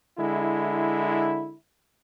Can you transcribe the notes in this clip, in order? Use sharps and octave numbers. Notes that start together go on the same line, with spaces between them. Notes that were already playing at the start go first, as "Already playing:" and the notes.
D3 G#3 E4